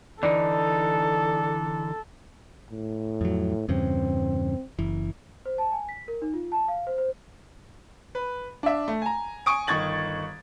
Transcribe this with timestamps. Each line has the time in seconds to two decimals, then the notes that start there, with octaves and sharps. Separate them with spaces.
0.23 D3 E3 D#4 A4 D5
2.71 A2
3.21 F2 F#3
3.69 E2 G2 C#3 C4
4.79 F#1 E3
5.46 C5
5.58 A5
5.72 G#5
5.89 B6
6.08 A#4
6.22 D#4
6.34 F4
6.52 A5
6.68 F5
6.87 C5
6.98 C5
8.15 B4
8.63 D4 E5
8.88 A3
9.02 G#5 A#5
9.46 G#5 C#6 D#6 D7
9.67 G1 D#3 C#6 G#6 A6 F#7